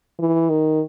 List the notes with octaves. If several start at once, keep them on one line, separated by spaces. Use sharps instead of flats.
E3
D#3